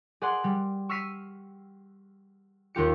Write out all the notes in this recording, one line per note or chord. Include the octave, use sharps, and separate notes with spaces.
G#4 D5 F#5 C6
G3
C#6 E6 F6 B6 C7 D#7
D#2 F4 G4 C#7